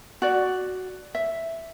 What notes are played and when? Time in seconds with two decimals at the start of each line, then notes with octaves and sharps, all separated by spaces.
0.22 F#4 D5
1.15 E5